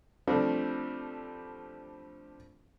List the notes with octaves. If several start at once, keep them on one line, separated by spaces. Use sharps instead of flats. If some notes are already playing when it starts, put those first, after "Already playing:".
F3 G3 A3 C4 D4